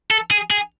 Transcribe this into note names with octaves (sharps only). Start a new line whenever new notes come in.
A4
G#4
G#4